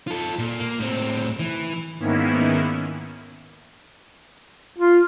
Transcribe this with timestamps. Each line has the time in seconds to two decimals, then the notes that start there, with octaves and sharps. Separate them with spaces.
0.07 F4 A4
0.39 A#2
0.60 A#3
0.80 A2 C4
1.40 E3
1.99 G#2 D#3 A#3 B3 C#4 E4
4.78 F4